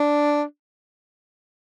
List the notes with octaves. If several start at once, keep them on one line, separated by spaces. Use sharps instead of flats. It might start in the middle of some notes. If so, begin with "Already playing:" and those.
Already playing: D4